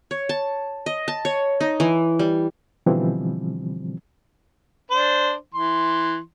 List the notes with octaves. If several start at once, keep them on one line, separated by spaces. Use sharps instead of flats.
C#5
A5
D#5
A5
C#5
D#4
E3
G3
B2 D3 E3 F3 G3 C4
D4 C5
E3 C6